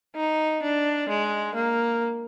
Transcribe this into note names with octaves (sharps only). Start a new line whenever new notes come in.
D#4
D4
G#3
A#3